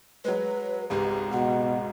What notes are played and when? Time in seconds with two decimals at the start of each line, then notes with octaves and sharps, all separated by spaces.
0.25 F#3 G#3 B4
0.90 G#1 C#2 G#2 G4
1.31 B2 F#5